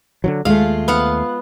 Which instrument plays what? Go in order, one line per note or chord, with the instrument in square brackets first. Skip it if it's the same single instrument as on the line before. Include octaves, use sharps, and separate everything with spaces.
[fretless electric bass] D3 E3 F#3
[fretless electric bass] D#2 A3 [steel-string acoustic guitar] G#3 F4 [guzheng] F5
[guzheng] B3 F5 F#5